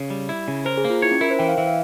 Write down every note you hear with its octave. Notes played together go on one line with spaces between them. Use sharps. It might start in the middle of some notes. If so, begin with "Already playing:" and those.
Already playing: C#3
G3
E4
C#3
A#4 C5
G#4
A#3
F4
E4 C#5
C#4
E4 A#4
C5
E3 G5
F5
E3 E5
F5